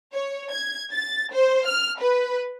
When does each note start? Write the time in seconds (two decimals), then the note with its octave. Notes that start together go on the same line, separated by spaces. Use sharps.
0.14 C#5
0.51 G#6
0.93 A6
1.33 C5
1.67 F6
1.99 B4